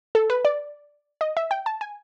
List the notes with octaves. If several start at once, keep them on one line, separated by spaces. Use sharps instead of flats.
A4
B4
D5
D#5
E5
G5
A5
G#5